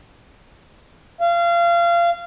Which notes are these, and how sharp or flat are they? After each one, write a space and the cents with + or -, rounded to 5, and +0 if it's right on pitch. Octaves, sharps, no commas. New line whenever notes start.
F5 -25